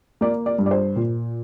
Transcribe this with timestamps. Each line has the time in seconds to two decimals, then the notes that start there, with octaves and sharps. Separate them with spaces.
0.21 A#3 D5
0.46 D5
0.58 G2
0.66 D5
0.71 C5
0.96 A#2